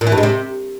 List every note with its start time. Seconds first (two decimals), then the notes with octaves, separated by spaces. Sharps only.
0.01 A#2
0.07 E3
0.12 G2
0.18 G#3
0.23 C3